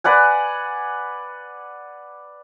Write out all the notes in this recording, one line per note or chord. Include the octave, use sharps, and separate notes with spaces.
B4 D5 F#5 G#5